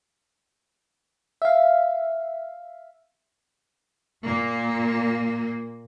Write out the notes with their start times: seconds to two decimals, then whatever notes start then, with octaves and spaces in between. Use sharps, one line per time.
1.42 E5 F5
4.25 A#2 A#3